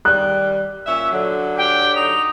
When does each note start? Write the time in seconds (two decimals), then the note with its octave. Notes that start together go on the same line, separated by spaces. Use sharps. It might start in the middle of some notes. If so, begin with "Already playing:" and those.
0.05 D#3 G3 F#6
0.86 A#2 C#4 E5
1.12 D3 F#3
1.58 G4 G5
1.96 D#4 F7